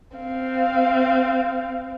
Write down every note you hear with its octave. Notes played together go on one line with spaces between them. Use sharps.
C4 F5